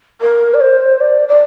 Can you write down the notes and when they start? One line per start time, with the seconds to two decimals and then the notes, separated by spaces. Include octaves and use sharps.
0.21 A#4
0.54 D5
0.61 C5
1.00 D5
1.29 D5